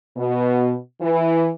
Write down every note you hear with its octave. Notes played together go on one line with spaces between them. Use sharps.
B2
E3